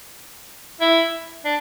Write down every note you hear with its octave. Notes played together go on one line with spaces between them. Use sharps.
E4
D4